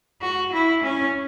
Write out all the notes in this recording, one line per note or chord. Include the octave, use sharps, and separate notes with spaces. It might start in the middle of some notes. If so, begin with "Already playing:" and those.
F#4
E4
C#4